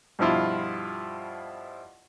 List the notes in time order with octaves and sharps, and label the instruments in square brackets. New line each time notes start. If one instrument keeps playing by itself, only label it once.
[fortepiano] G2 B2 F3 E4 F4